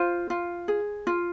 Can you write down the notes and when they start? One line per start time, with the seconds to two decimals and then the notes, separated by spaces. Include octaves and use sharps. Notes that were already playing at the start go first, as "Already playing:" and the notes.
Already playing: F4 C5
0.30 F4
0.68 G#4
1.07 F4